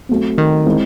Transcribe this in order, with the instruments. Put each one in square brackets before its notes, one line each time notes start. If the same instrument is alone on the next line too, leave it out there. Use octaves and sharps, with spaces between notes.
[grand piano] F#3 A3 C4
[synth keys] D#3
[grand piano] G#3 C4 E4